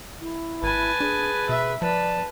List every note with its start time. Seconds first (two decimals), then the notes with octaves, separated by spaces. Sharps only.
0.21 E4
0.63 G#1 B4 G#5 A5
1.01 D4 G#4
1.49 B2 E5
1.82 F3 B4 D5 A5